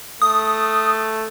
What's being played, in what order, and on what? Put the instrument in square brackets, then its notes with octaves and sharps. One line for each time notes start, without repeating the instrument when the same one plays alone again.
[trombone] A3 [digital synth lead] D#6